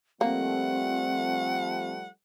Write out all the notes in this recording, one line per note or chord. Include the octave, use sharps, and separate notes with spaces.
F3 G3 A3 A#3 C4 F#5